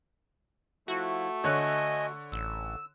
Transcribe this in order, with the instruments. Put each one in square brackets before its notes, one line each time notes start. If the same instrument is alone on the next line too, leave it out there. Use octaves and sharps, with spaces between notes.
[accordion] F3 E4 [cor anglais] A3 [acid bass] F#4
[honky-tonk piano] D3 C#5 F#6 [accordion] D#5 G#5
[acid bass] A1 [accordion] E6